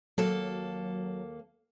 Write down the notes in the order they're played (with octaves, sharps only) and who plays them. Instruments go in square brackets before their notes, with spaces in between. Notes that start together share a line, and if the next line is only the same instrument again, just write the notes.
[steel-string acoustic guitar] D#2 A#3 A4 [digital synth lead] F#3